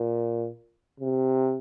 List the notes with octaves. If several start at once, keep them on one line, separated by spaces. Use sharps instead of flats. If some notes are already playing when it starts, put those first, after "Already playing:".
Already playing: A#2
C3